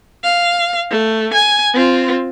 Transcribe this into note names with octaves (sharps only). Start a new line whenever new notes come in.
F5
A3
G#5
C4 F4